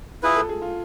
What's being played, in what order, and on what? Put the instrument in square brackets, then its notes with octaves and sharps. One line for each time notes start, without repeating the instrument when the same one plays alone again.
[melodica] E4 G#4 B4 [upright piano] F4
[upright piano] A4
G#4
F4